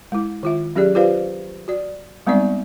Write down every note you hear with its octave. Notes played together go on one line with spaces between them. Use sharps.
G#3 E4
D#3 F4 E5
F#3 C#4 G4 G#4 D5
F4 G4 B4 C5 D5 F5
F#4 D5
G3 G#3 B3 C4 D#4 D5